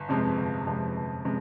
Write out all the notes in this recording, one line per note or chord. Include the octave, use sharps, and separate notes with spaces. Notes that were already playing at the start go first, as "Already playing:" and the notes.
Already playing: G1
F2 C3 F3 G#3
G1
F2 C3 F3 G#3
G1
C3 F3 G#3